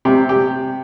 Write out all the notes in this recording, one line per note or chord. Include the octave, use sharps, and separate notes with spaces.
C3 G4
G4